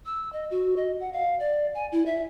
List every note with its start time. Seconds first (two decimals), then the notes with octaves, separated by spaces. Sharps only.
0.06 E6
0.33 D#5
0.51 F#4
0.77 D#5
1.00 F#5
1.13 F5
1.40 D5
1.75 G#5
1.92 E4
2.06 E5